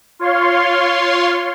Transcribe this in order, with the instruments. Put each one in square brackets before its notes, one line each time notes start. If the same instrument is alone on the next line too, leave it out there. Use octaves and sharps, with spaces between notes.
[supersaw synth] F4 C#5 F5 C6